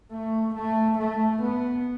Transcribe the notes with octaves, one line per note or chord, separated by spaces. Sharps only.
A3
A3
A3
B3